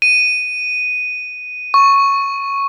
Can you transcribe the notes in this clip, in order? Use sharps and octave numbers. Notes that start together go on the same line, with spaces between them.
D#7
C#6